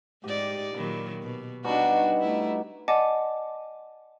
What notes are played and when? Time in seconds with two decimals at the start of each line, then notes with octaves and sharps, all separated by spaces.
0.24 G#2 D#4 G4 D5
0.74 A#2 D#3 F#3 B5
1.22 B2
1.64 B2 G3 D4 D#4 F#4
2.21 A3 E4
2.88 D5 D#5 F#5 G#5 A5 D6